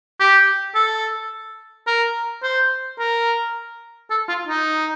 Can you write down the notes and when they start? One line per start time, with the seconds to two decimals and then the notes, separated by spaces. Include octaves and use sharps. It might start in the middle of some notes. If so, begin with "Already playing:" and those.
0.20 G4
0.75 A4
1.87 A#4
2.43 C5
2.99 A#4
4.10 A4
4.28 F4
4.47 D#4